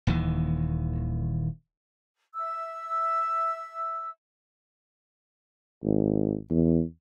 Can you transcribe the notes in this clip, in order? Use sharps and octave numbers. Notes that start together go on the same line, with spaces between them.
D#1 D#2 D#3 E3
E5 E6
G#1
E2